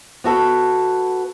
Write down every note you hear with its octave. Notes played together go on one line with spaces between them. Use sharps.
B3 F#4 A4 B4